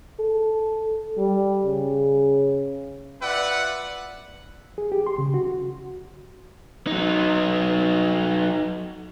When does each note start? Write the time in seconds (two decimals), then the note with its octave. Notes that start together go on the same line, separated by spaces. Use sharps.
0.19 A4
1.18 G3
1.65 C#3
3.22 F4 B4 D5 E5 F#5
4.78 G#4
4.92 G4
5.07 C6
5.18 C#3
5.34 F#4
5.48 F#4
6.87 F#3 D#4